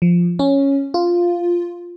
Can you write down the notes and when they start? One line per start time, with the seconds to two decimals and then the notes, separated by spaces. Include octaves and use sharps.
0.02 F3
0.39 C#4
0.94 F4